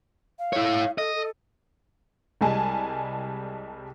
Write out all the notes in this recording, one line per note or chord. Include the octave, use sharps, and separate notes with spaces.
F5
E4 C#5
A4 D#5
A4
C2 G3 G#3 G#5 A5